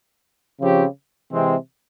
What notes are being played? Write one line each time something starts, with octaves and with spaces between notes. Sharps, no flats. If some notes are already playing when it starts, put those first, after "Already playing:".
C#3 F3 C4 G4 C#5
C3 E3 G#3 C4